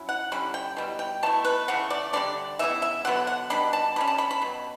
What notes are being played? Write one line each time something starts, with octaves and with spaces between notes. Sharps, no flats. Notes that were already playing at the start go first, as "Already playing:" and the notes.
Already playing: F#3 C#4 E4
F#5
D3 G3 C#4 E4 B5
G5
B2 G3 E4
G5
B2 A3 E4 A5
B4
C#3 E3 A3 F#5
D5
D3 G3 D4 D5
C#3 E3 B3 E4 E5
E5
D3 F#3 B3 F#5
F#5
B2 G3 D4 B5
A5
B2 G3 C#4 B5
A5
B5
B5
B2 F#3